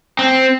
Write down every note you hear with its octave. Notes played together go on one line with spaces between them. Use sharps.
C4